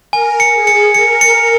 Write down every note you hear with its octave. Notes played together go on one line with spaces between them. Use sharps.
A#4 G#5
C#7
G#4
C#7
A#4 C#7
C#7